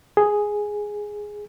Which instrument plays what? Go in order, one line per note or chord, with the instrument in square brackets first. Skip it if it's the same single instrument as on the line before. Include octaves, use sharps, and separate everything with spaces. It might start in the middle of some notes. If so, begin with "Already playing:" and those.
[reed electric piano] G#4